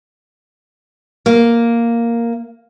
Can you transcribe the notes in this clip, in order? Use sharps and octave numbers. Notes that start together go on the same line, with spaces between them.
A#3